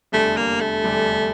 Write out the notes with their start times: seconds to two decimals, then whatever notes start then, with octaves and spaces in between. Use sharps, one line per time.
0.12 F1 E2 D3 G3 A3 D4
0.37 A#3
0.61 A3
0.84 F1 E2 D3 G3 D4